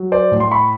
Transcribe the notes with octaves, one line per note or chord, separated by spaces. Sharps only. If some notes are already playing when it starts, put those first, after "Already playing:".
Already playing: F#3
C5 D5
A2
C6
B5 C#6